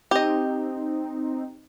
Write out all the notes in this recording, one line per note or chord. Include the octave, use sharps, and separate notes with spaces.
C4 D#4 G4 D#5